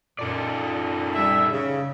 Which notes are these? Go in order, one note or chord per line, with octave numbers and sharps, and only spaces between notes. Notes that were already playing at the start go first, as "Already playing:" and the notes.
F#2 A#2 D#4 A4 D5
G3 E5
C#3